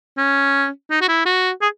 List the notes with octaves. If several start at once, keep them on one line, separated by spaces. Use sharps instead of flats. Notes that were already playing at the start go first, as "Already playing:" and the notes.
C#4
D#4
F#4
E4
F#4
G#4